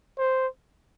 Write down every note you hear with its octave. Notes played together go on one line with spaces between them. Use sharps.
C5